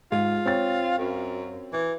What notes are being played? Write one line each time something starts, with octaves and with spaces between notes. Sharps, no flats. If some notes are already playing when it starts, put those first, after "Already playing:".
G#2 F4
C4 C#5 A6
F#2
E3